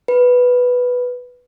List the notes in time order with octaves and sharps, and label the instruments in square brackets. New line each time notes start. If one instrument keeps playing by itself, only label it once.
[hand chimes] B4